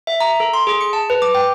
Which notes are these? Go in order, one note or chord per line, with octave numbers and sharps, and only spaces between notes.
E5
A#5
A4
C6
G#4
C#7
A5
B4
D6
G5